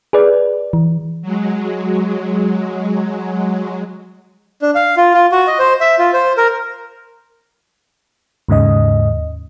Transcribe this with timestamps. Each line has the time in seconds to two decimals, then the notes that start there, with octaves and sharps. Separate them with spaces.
0.13 G#4 B4 D5
0.73 E3
1.22 F#3 G#3
4.62 D4
4.75 F5
4.97 F4
5.14 F4
5.32 F#4
5.47 D#5
5.59 C5
5.81 E5
5.99 F4
6.14 C5
6.38 A#4
8.49 D#2 G#2 C#3 D#5